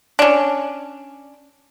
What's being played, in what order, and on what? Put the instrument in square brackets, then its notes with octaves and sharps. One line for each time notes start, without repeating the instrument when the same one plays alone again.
[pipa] C#4 D4